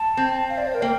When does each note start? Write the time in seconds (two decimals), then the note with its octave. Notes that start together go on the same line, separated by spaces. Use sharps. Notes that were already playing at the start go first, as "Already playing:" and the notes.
Already playing: A5
0.17 C4
0.49 F5
0.58 D5
0.67 C5
0.74 A#4
0.82 A#3 G5